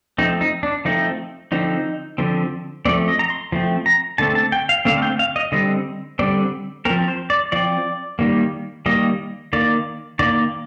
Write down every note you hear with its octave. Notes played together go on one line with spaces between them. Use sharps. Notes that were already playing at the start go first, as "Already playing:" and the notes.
F3 A3 C4 D#4
D#4
D4
F3 A3 C4 D#4
D3 F3 C4 D#4
D3 F3 C4
F3 A3 C4 D5
D#5
A#5
C6
F3 A3 C4
A#5
D3 A3 C4 A5
A5
G5
F5
D3 A3 C4 F5
F5
G5
F5
D#5
D3 G3 C4 D#5
D3 G3 C4 D5
F3 C4 A#4
C5
D5
F3 C4 D5
D#3 G3 A#3
D#3 G3 A#3 D#5
D#3 A#3 D5
D#3 A#3 D5